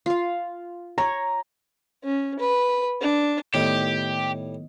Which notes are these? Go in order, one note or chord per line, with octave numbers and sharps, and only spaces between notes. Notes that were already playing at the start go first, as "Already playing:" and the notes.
F4 F5
C#5 A#5
C#4
B4
D4
A2 D#3 G3 B3 G4 D#5